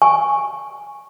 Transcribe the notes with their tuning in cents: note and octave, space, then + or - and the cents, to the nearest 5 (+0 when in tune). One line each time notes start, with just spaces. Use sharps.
G#5 -5 C#6 -10